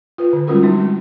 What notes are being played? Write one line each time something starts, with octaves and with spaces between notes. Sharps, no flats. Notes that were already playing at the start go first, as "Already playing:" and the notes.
F4 B4
D3
G3 G#3 C#4 F4 F#4 A#4
F#3 G#3 C4 D#4 E4 F#4
G#3 E4